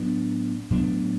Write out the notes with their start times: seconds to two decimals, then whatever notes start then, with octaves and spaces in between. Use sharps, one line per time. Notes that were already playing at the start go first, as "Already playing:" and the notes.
Already playing: A2 F#3 B3 D4
0.70 A2 F#3 B3 D4